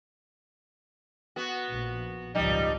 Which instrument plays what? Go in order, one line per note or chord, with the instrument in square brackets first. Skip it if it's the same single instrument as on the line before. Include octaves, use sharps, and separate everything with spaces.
[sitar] B3 F#4
[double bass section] A#1
[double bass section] G#1 C#2 F3 [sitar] G3 D#4